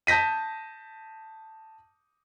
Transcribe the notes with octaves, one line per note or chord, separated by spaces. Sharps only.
A5 G6 A#6 B6 D#7